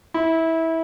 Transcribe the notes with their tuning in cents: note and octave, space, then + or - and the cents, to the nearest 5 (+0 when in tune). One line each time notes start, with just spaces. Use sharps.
E4 -20